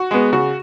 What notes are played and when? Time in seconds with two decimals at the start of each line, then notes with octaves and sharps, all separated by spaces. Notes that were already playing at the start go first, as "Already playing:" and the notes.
Already playing: F#4
0.11 G#3 B3
0.32 C#3 F#4